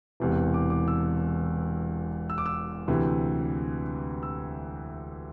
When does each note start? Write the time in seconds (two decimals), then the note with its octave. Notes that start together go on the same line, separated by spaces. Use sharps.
0.20 E1 E2 C3 E3
0.54 D6
0.70 D6
0.88 E6
2.30 E6
2.38 D6
2.46 E6
2.88 D2 C3 E3
4.23 E6